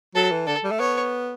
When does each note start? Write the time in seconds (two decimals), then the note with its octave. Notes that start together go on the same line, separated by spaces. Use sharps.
0.15 F#3 A4
0.31 E3
0.47 D3 A4
0.64 G3
0.71 A3
0.80 B3 C#5